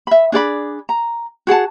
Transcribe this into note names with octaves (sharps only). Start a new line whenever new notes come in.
E5 B5
D4 G#4 D5 B5
A#5
F#4 G#4 F#5 A5